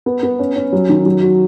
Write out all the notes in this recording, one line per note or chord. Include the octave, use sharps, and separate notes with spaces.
B3
B3
C#4
C#4
F#3
D#3
F#3
F#4